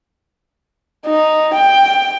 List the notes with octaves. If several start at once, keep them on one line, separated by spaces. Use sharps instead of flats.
D#4
G5